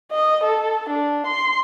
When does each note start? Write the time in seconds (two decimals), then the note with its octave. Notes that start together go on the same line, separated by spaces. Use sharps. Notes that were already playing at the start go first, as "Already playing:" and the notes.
0.12 D#5
0.43 A4
0.90 D4
1.26 C6